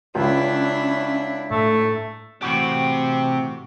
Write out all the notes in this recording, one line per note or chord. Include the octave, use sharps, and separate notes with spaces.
C#2 C#4 D4 E4
A2 A3
A2 C3 E3 C4 F#4 G4